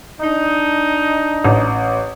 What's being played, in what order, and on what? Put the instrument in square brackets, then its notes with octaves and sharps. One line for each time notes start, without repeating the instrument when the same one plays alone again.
[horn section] D4 D#4
[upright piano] A1